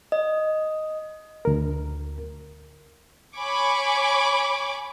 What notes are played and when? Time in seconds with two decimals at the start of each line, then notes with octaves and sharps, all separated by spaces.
0.12 D#5
1.45 D2 A#4
3.37 C#5 G#5 B5 C#6 D6